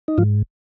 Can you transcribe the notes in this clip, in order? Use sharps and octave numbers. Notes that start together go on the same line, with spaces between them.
D#4
G#2 F3 F4